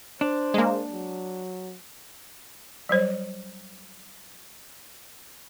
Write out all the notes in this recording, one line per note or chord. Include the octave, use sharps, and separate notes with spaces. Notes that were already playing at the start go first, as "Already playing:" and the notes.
D4 C5
G#3 A#3
F#3
F#3 G3 C5 C#5